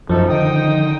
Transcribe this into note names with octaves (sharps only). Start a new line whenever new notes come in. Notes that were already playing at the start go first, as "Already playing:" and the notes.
F#2 F3 A3 D#4 A4
D3 D#3 D#4 G5 D#6